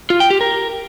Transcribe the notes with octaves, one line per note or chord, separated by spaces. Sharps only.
F4
G5
G4
A#4